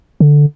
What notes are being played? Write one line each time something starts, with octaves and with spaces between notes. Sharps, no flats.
D3